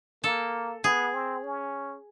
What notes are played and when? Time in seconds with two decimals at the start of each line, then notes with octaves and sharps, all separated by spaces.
0.24 A#3 A4
0.84 B3 G#4
1.14 C4
1.44 C#4